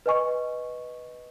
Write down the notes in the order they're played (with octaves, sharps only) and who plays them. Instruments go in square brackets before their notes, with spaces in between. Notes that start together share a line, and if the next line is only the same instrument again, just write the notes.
[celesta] B4 D#5 G#5 C#6